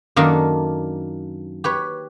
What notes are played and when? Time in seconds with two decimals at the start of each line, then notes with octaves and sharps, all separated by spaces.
0.16 F#2 D#3 A#3 D4 A4 A#4
1.64 G4 B4 C#5